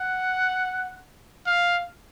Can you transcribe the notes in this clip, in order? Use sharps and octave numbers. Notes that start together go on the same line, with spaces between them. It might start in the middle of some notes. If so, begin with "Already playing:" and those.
Already playing: F#5
F5